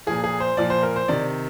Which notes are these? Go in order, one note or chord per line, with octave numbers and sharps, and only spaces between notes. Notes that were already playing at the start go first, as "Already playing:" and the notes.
A#2 F3 G#4
G#4
C5
A#2 F3 D5
C5
A#4
C5
C3 D#3 D5